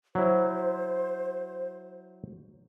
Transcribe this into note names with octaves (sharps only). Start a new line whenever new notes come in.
F#3 E4 C5